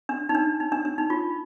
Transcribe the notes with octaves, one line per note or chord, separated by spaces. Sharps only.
D4
D#4
D4
D#4
D4
D4
D#4
F4